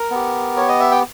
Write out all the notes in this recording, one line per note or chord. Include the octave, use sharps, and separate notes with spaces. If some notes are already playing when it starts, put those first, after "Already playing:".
Already playing: A#4
B3 G4
C#5
D#5
E5
G5